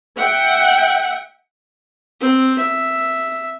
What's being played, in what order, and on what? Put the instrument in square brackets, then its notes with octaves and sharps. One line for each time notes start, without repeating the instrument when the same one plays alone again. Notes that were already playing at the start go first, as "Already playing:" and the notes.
[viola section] E5 F#5 G5
[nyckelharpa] C4
E5